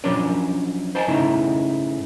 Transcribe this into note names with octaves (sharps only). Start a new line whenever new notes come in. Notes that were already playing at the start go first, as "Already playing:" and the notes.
F3 F#3 C#4 D4 D5
C5 D#5 G#5 A5
G#2 C#3 A3 D#4 E4